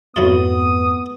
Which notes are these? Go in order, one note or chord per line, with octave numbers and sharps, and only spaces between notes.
F2 G#2 F#3 A3 B3 E4 F4 D#6